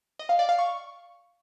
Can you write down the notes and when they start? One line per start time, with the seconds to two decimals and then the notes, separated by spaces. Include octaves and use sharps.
0.19 D#5
0.29 F5
0.39 D5
0.49 F5
0.59 C#6